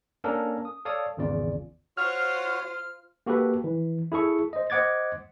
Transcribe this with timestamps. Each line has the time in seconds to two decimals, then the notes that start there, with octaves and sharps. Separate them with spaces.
0.24 A#3 C#4 D4 A4 A#4
0.65 D#6
0.85 A4 C#5 D5 F5 D#6
1.17 G#1 E2 C#3 F4 D5
1.97 F4 F#4 C5 C#5 F6
3.26 A#3 F#4 G4 A4 B4
3.64 E3
4.12 E4 G#4 A4 C#6
4.53 C5 D#5
4.70 C5 D#5 F#5 D6 G#6 A6